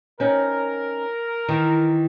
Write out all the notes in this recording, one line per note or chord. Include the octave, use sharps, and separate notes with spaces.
C4 C#4 D#4 A#4
D#3 E3